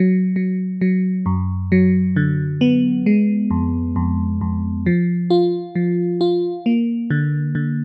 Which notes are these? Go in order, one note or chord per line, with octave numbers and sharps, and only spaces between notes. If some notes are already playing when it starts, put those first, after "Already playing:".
Already playing: F#3
F#3
F#3
F#2
F#3
D3
B3
G#3
F2
F2
F2
F3
F4
F3
F4
A#3
D3
D3